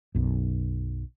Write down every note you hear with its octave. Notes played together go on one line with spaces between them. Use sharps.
B1 F#2